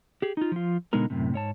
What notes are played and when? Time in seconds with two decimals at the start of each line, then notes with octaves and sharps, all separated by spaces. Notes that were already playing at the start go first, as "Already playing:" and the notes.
0.22 G4 G#4
0.37 D#4 F4
0.52 F3 F4
0.93 B2 D3 G#3 B3 D#4 A#4
1.10 F#2 A2 C3
1.34 G#2 C#5 A5